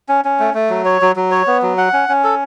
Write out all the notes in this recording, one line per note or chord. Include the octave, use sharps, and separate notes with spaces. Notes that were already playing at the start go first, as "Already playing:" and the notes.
C#4
C#4
A3
A3
F#3
C#5
F#3
F#3
C#5
B3
F#3
F#5
C#4
C#4
A4